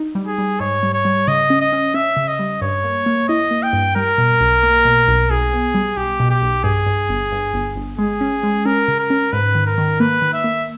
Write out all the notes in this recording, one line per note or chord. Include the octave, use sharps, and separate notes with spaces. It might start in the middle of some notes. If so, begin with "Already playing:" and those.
Already playing: D#4
G3
G#4
G3
G#2 C#5
G3
C#5
G3
C#3 D#5
C#4
D#5
C#4
C#4 E5
C#3
D#5
G3
G2 C#5
A#3
A#3
E4 D#5
A#3
G5
G2
G3 A#4
B2
B1
A#3
B2
B1
B1 G#4
B3
G3
B1 G4
B2
G4
B1
G2 G#4
G2
G1
G2
G1
G1
G#3 G#4
C#4
G#3
C#4 A#4
C#3
A#4
C#4
G#2 B4
D#3
A#4
D#3
A#3 B4
D#3
E5
A#3